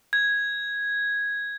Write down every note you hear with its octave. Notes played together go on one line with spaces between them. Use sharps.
G#6